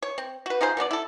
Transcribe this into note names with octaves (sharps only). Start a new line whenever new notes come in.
C#5
C4
F#4 B4
D#4 F4 G#4 C5
B2 B3 D4 D5
E4 A4